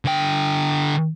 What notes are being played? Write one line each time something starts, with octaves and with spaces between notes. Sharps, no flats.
D3 G5